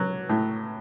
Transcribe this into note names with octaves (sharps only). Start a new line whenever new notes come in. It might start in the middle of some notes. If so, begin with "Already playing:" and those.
Already playing: F#3
A2